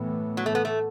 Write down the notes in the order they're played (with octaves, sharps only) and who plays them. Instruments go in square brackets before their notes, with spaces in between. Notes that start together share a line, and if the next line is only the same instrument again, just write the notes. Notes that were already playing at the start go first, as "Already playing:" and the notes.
Already playing: [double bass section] A2 E3 B3
[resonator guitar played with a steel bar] F#3
A3
B3
A3